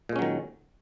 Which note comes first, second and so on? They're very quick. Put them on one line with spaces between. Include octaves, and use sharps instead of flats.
A#2 G#3 C#4 F#3 D#3